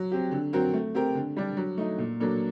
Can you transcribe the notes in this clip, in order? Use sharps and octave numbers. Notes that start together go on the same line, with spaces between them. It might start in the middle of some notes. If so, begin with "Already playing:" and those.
Already playing: F#3
C4 G4
D3
F#3 C4 F#4 A#4
A3
C4 G4 A#4
D3
G3 D4
F#3
A3 D#4
A#2
F#3 A#3 D4 A4